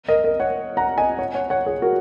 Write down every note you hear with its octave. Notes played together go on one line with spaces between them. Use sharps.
A#4 D#5
A#4 D#5
C#5 F#5
F#5 A#5
D#5 G#5
C#5 F#5
C#5 F#5
C#5 F#5
G#4 C#5
F#4 A#4